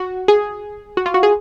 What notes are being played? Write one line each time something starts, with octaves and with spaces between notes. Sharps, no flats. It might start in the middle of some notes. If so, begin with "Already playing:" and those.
Already playing: F#4
G#4
F#4
F4
F#4
G#4